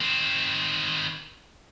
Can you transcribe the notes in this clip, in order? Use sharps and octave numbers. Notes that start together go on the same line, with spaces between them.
D#3 C4